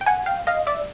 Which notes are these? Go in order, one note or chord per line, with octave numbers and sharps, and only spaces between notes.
G5
F#5 G#5
F5 G5
D#5 F5
D5 E5